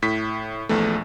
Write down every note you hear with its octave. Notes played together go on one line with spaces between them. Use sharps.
A2 B6
A#1 E2 A3